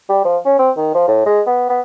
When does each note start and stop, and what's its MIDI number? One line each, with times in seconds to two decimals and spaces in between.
0.09 0.20 55
0.25 0.37 53
0.45 0.58 61
0.59 0.70 60
0.77 0.94 51
0.94 1.05 53
1.08 1.26 45
1.26 1.41 56
1.46 1.65 59
1.69 1.81 59